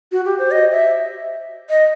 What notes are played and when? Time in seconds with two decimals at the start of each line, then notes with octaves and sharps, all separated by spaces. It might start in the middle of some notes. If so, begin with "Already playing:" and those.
0.12 F#4
0.26 G4
0.39 C5
0.51 D#5
0.71 E5
1.69 D#5